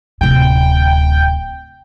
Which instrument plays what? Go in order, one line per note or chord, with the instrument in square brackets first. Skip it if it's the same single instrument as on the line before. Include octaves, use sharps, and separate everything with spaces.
[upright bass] D1 C3 [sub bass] D2 [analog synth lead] G5